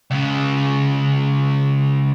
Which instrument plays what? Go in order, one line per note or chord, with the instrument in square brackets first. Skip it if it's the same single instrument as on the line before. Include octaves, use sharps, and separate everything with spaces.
[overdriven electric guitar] C#2 C#3